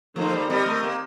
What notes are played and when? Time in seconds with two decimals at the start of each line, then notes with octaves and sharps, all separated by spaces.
0.16 D#3 F3 A#3 D#4 A4 C5
0.33 G3
0.50 G3 C4 G4 A#4 D#5
0.66 A3
0.83 A#3